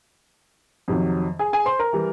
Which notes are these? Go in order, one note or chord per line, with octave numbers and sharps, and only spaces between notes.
F2 C3 D#3 F#3
G#4 G#5
G#4 G#5
C5 C6
A#4 A#5
E3 G3